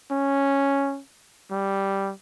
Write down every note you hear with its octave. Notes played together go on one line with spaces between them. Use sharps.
C#4
G3